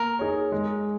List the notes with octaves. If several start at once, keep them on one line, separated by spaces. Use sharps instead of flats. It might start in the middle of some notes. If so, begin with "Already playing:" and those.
Already playing: A#3 A#4
D#4 G#4 C#5
G#3